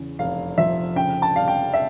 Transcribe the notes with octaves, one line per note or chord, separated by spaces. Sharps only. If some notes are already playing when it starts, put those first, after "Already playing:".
Already playing: E2 C#3
F1 F5
F3 E5
C#3 G5
A5
G3 F5
G5
E5